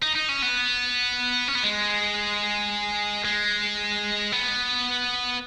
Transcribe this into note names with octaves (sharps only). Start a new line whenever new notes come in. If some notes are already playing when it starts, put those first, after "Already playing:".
D#4
D#4
C#4
B3
C#4
B3
G#3
G#3
B3